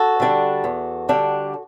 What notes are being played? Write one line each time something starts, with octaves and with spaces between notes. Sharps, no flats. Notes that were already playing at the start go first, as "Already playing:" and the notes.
Already playing: F#4 A4
D3 G3 D4
E2
D3 G3 D4